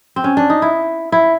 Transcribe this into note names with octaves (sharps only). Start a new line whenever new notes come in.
C4
C#4
D4
D#4
E4
E4